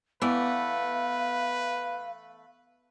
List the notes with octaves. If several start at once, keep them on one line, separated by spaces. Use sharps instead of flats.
E3 A3 B3 B4 D5 F5